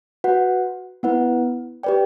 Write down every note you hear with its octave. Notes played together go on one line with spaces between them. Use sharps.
F#4 B4 F#5
B3 E4 B4 F#5
G4 B4 D5 G5